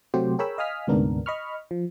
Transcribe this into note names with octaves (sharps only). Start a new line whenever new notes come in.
C3 F#3 A3 F#4 G4 C5
G#4 A#4 C#5 G5 B5 E6
D#5 F5 G#5 D#6 F6 B6
D2 G#2 C3 B3 D4 A#4
D#5 B5 C#6 F6
F3